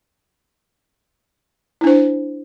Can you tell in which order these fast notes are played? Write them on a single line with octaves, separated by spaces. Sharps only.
E4 D4 C5